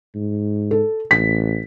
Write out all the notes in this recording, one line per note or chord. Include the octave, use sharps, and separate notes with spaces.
G#2
A4
A1 B6